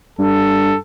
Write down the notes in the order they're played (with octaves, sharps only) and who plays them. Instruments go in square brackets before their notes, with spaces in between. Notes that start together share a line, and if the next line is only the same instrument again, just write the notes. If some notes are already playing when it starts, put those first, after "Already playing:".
[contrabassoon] G2 [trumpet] A4